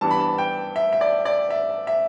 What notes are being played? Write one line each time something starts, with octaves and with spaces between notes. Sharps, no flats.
G2 E3 G3 B3 D4 A5
B5
A5
G5
E5
E5
D5
D5
E5
E5